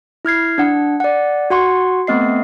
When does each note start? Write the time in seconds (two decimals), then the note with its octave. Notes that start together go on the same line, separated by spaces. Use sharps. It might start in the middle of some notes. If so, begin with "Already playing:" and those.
0.25 E4 F6 G#6 C7
0.58 D4 F#5
1.00 D5 F#5
1.50 F#4 F#5 C6 C#6
2.07 A3 B3 C4 D#5 C7